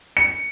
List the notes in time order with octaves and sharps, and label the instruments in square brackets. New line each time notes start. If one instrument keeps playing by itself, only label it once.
[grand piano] C#7